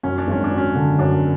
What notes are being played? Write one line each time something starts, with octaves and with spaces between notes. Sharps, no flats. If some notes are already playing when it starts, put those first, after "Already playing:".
F#2 C#4
D4
G#1 C#4
D4
F#3
C#4
D3
F#2 D4